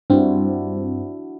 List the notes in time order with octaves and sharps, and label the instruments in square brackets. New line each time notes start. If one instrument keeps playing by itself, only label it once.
[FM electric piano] G2 C4 [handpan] D4 E4 F#4